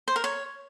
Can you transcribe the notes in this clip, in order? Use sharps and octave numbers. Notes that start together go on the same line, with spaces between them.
C5
A#4
C#5